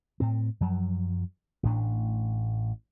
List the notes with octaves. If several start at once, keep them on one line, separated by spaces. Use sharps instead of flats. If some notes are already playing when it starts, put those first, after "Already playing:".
A2 C4
F#2 F3 F#3
A1 A2 D4